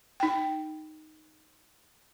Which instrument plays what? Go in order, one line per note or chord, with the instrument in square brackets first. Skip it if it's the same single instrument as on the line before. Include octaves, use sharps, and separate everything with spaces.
[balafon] D#4 G5